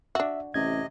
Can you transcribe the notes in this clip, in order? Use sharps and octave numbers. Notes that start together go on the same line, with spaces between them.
D4 F#4 E5
A1 C3 D#5 G#6